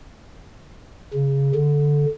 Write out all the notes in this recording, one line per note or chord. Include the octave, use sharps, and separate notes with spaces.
C#3
D3